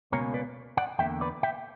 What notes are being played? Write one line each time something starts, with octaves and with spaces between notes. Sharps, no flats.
C#2 B2 A#3 C#4 A#4 C#5
B4 D5
D5 F#5
E2 D3 A#3 E5 G5
B4 D5
E5 G5